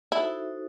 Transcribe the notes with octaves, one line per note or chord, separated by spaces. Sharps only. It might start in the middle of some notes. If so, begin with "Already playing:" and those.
D#4 E4 F#4 A4 C5